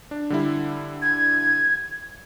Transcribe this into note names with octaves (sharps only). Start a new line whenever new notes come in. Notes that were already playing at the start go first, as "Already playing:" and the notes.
D4
D3 G3 E4
G#6